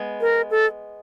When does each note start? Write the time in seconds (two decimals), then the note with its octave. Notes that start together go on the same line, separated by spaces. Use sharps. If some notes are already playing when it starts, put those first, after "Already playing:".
Already playing: G#3 B3
0.21 A#4
0.50 A4